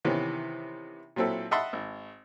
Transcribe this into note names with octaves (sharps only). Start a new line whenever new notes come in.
C3 D#3 E3 B3 C#4
A#2 F#3 C4 E4 A4
D#5 E5 F#5 A5 B5 C6
G#1